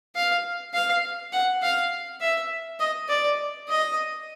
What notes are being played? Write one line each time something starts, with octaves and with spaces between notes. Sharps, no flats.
F5
F5
F#5
F5
E5
D#5
D5
D#5